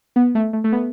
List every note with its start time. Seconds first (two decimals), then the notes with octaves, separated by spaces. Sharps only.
0.16 B3
0.35 A3
0.53 A3
0.64 A3
0.72 B3